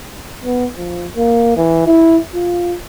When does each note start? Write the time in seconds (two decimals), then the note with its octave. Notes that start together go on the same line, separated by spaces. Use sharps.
0.44 B3
0.78 F3
1.16 A#3
1.57 E3
1.87 E4
2.34 F4